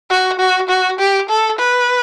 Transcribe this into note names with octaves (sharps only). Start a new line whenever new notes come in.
F#4
F#4
F#4
G4
A4
B4